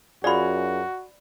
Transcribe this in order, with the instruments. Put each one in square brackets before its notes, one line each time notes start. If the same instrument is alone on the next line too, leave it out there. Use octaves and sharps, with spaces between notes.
[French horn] F#2 [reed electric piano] F4 G#4 [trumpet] F#4 [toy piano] D5 B5